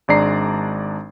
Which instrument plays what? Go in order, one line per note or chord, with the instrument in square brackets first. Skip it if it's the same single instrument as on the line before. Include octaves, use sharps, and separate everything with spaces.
[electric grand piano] G#1 G#3 D4 D5 A#5 C7